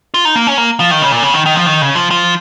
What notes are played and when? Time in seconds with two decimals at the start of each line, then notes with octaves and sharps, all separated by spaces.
0.14 F4
0.25 D#4
0.36 A#3
0.47 C#4
0.58 A#3
0.80 F3
0.91 D#3
1.02 C#3
1.12 A#2
1.23 C#3
1.34 D#3
1.46 D#3
1.56 F3
1.66 D#3
1.82 C#3
1.96 F3
2.11 F3